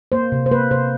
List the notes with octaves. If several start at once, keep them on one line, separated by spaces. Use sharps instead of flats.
A#3 C5
C3
C5
A#3 B4
C3 C5